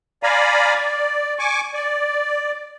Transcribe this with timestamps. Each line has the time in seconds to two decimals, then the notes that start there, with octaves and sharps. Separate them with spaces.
0.23 D5 F5 G#5 A#5 B5
0.75 D5
1.39 G#5 C#6 D6
1.74 D5